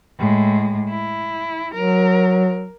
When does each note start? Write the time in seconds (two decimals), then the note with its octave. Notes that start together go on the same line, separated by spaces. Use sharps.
0.19 A2 G#3
0.89 E4
1.74 F#3 A#4